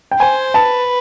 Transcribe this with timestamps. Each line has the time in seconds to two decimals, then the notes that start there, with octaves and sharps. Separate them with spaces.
0.11 G5
0.19 C5 G#5
0.54 B4 A5